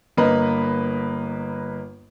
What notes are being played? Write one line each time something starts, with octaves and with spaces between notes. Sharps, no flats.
G1 A#3 B4 D#5 B5